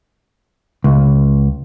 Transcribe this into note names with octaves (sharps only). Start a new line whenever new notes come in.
C#2